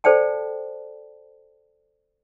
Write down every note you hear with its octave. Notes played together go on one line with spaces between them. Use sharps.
A4 C5 D5 G5 A5